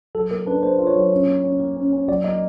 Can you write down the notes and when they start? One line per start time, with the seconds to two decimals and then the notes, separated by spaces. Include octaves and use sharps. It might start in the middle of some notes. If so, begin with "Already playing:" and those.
0.15 F#3 A4
0.31 A#3 A#4
0.46 D4 B4
0.63 A#3 C5
0.78 F4
0.87 C#5
0.96 F#3
1.11 C#4
1.27 A#3
1.44 C#4
1.60 A#3
1.76 C#4
1.92 C#4
2.08 F#3 D5
2.24 A#3 D#5